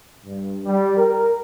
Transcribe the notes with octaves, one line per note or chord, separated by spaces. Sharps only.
G2
G3
A#4